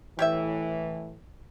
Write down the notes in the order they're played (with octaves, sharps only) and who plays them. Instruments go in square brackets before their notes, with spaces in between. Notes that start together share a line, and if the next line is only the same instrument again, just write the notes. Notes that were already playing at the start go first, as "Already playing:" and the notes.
[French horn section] A2 E3 [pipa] G4 C#5 E5